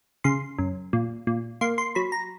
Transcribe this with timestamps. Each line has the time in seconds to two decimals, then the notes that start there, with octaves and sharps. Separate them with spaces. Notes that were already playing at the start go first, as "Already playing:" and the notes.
0.24 C#3 C6
0.59 F#2
0.93 A#2
1.27 A#2
1.61 A#3 C6
1.78 C6
1.95 F#3 B5
2.12 A#5